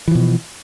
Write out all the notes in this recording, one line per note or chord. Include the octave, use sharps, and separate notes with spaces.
B2 E3 F3